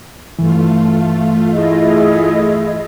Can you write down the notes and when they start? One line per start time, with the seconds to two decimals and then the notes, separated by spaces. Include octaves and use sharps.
0.39 G2 E3 A3 F4
1.52 E4 G#4 D#5